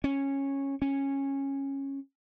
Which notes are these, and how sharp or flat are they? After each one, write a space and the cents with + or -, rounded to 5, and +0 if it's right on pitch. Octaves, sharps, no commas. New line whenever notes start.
C#4 -10
C#4 -15